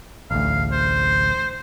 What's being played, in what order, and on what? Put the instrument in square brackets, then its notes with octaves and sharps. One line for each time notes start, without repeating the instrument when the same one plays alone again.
[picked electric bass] A1 D2 [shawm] F5
[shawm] C5